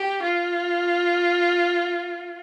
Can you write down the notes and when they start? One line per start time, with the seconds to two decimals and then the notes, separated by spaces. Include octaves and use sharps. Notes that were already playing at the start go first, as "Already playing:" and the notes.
Already playing: G4
0.23 F4